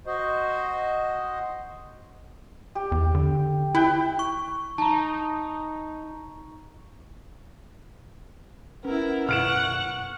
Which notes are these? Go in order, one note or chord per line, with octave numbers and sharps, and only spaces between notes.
F#4 C5 D#5
G4
E2
D3
E4 B4 G5
C#6
D#4 A5 A#5
B3 C#4 E4 A#4
F#2 B2 F#5 C#6 F6 D7 E7